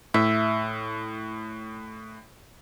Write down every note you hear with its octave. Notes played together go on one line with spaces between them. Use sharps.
A2 E5